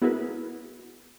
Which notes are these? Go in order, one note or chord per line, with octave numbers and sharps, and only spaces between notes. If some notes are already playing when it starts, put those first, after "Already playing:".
B3 E4 F#4 G#4 A#4 B4